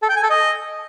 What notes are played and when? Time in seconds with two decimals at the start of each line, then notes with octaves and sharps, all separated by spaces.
0.02 A4
0.09 G5
0.16 G#5
0.23 A4
0.30 D#5